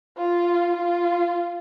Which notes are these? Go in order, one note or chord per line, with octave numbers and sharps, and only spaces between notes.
F4
F4